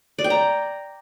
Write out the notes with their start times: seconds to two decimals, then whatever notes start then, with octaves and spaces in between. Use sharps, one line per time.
0.18 D5
0.24 G5
0.30 A#5